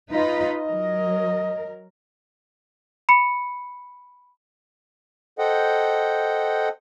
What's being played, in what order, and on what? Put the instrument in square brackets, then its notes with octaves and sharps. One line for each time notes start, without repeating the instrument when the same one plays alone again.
[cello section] D#4 F4 B4 [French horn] D#5
[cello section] F#3 A#4
[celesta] B5 C#7
[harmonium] A4 C5 D#5 F#5 G5